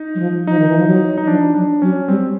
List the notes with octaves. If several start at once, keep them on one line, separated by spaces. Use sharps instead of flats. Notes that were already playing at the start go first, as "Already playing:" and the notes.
Already playing: D#4
F#3
F3
F3 D#4
D#3
E3
F3
F#3
D#4
F3 D4
F#3 D4
F#3 C#4
G3 C4